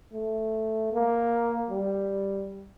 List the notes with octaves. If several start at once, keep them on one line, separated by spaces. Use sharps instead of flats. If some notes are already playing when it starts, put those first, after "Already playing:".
A3
A#3
G3